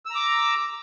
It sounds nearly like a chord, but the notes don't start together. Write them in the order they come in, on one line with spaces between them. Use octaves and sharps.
E6 A#5 D6